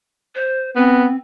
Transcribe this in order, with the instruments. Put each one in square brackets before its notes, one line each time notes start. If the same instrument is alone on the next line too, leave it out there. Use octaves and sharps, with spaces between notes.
[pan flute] C5
[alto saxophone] B3 [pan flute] C4